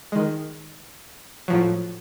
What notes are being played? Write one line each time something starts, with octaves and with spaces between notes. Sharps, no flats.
D#3 G#3
A2 F3 F#3